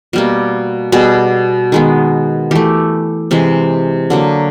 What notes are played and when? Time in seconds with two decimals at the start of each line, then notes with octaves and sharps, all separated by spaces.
0.13 B2 G3 A#3
0.92 B2 G3 B3 G#4
1.72 D#3 G#3 B3
2.51 E3 A3 G4
3.31 C3 E3 G#3
4.10 D3 F#3 A#3